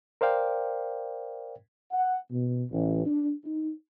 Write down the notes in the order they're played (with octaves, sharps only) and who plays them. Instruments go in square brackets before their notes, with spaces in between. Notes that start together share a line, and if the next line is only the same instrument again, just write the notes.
[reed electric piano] A#4 C5 D5 F5 G5
[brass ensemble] F#5
B2
A1
D4
D#4